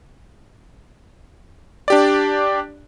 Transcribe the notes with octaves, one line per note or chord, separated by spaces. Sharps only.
D4 G4 D5